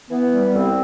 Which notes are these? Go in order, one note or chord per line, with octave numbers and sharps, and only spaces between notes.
E3 B3
G3
C2 C4